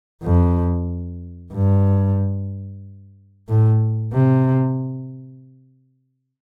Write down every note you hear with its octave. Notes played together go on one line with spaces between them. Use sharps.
F2
G2
A2
C3